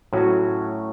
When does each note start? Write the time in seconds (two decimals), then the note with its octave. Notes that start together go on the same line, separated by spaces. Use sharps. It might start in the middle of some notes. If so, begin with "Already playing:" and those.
0.13 A2 F#3 C#4 F#4